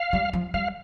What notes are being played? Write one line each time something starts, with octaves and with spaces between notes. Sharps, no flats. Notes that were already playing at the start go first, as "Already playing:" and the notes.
Already playing: F5
G3
F3
G3 F5